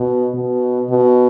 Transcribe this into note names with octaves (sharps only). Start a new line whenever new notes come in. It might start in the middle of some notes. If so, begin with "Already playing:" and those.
Already playing: B2
B2
B2